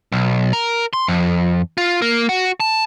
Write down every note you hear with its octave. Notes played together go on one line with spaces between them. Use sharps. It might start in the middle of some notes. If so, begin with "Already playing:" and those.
B1
A#4
C6
F2
F4
A#3
F#4
A5